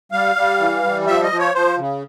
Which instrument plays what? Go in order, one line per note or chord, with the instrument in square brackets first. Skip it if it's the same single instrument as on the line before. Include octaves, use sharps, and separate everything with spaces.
[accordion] G3 F5
G3
E3
G3
F3 E5
D#5
F3
C#5
F3 C5
C#3